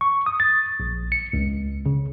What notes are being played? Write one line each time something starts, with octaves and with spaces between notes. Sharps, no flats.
C#6
D#6
A6
A#1
C#7
C#2
C#3